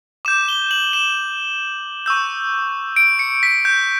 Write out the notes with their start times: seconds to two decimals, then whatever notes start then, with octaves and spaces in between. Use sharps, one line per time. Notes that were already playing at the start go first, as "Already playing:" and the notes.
0.25 D6 G6 E7
0.48 G7
0.71 F#7
0.93 E7
2.06 C#6 E6 G6
2.96 D7
3.19 C#7
3.43 B6
3.65 G6